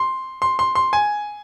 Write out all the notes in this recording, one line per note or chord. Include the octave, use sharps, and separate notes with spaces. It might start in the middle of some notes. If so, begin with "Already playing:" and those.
Already playing: C6
C6
C6
C6
G#5